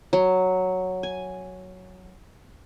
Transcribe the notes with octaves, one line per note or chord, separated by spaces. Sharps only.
F#3
G#5